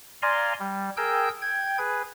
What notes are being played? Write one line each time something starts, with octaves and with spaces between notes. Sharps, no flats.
D5 F5 G#5 A#5 C6
G3
G#4 A#4 G5 E6 G6
G5 G#6
G#4 B4